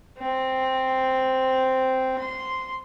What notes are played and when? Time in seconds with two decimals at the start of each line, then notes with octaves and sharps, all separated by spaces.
0.18 C4
2.19 C6